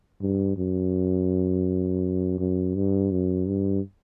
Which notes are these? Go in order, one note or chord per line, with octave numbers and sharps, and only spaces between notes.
G2
F#2
F#2
G2
F#2
G2